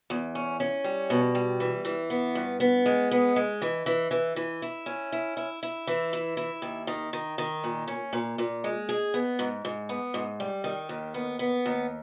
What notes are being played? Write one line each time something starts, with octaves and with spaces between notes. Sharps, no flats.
E2
C#4
C#4
G3
B2
G3
E3
E3
B3
G2
B3
G#3
B3
G#3
E3
E3
E3
E3
E4
C#4
E4
E4
E4
E3
E4
E4
D#2
D#3
D#3
D#3
A#2
C#4
A#2
A#2
G#3
G#4
B3
G#2
G#2
B3
G#2
G3
D#3
D#2
B3
B3
D#2